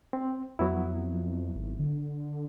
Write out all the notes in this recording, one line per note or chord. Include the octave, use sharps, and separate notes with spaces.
C4
F2 F#3 B3 E4
G#1
D3